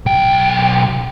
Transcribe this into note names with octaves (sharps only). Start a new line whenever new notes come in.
B1 G5